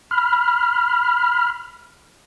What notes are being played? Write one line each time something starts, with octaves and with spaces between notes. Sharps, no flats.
B5 F6